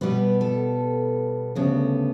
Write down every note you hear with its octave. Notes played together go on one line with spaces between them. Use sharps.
B2 G3 B3 B4
A4
D2 C#3 G3 B3